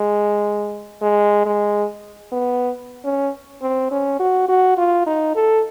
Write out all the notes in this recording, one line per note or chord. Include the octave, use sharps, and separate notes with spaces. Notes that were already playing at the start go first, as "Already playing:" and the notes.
Already playing: G#3
G#3
G#3
B3
C#4
C4
C#4
F#4
F#4
F4
D#4
A4